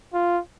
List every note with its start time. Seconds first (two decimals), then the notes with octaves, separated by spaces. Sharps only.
0.13 F4